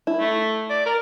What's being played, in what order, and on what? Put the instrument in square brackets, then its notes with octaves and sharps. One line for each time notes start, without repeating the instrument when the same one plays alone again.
[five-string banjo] E4
[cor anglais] A3
D5
A#4